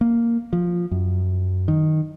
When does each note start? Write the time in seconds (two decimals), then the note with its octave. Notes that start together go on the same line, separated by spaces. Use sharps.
0.01 A#3
0.53 F3
0.91 F#2
1.68 D#3